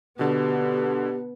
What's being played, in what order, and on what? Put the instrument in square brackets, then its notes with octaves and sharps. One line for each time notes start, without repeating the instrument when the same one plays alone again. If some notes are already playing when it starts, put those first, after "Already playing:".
[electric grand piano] B2 D3 [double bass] B3 [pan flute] G4